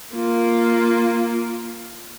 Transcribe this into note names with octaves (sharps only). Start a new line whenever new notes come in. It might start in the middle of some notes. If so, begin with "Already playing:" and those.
A#3 F4